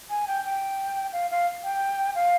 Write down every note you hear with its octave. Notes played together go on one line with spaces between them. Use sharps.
G#5
G5
G5
F5
F5
G5
F5